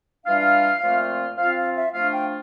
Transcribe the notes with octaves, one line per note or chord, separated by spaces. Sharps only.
E3 G3 D4 F4 F5
A#2 F3 A3 C4 F4
F3 C4 F4 F5
F5
E5
F3 A3 D4 F4 F5
G5